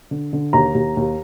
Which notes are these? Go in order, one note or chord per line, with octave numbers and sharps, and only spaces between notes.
D3
D3
D#2 A#5
D#2
D#2